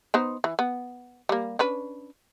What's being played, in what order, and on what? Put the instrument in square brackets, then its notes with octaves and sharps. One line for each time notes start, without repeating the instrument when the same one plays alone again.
[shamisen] B3 D#4 C5
E3
B3
G3 A#3
C#4 D4 B4